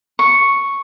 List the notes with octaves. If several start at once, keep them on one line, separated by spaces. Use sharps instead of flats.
C#6